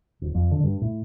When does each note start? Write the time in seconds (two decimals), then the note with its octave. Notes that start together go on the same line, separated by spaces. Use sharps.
0.21 D#1
0.35 F2
0.51 D3
0.64 G2
0.81 A2